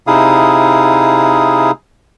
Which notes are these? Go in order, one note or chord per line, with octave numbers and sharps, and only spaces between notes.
C3 D#4 E4 G#4 F5 D#6